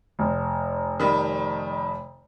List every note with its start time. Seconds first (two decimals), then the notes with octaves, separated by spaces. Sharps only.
0.19 F1
1.00 D#3 G3